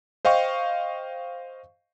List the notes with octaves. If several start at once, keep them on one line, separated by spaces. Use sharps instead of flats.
C5 D#5 F5 G5 C#6